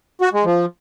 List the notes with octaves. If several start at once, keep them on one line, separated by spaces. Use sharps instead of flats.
F#4
G#3
F3